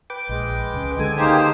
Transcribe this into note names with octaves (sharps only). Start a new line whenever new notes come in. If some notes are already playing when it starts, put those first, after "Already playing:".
B4 G5 D6
A#1 G#3
C#2 C#3
D3 G#3 G#4 A4 G#5
A#3 D#4 G4 C5